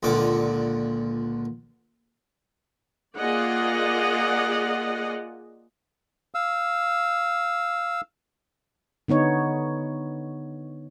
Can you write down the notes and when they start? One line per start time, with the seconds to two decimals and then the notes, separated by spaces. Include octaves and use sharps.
0.03 C#2 A#2 D3 D6
3.17 A#3 F4 G#4 D5 D#5 F#5
6.34 F5 E6
9.08 D3 B3 D#4 C#5